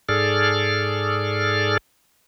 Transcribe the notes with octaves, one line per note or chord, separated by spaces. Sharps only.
G#2 G#4 A4 D5 F6